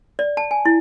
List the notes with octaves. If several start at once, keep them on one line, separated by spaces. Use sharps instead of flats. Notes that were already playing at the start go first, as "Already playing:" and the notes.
D5
A5
G#5
E4